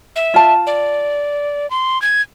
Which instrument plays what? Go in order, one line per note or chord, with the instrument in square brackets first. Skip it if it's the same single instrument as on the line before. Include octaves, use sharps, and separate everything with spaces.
[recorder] E5
[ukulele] F4 A5
[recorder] D5
C6
G#6